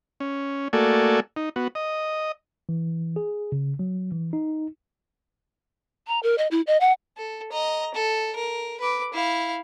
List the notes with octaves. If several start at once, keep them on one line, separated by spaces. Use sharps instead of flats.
C#4
A3 A#3 F#4 A4 D5 G#5
D#4
B3 F#4
D#5
E3
G#4
C#3
F#3
E3
D#4
A#5
A#4
D#5
E4
D#5
F#5
A4
D#5 A#5
A4
A#4
B4 D6
E4 F5